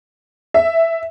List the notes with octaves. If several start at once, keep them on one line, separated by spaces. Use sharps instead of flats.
E5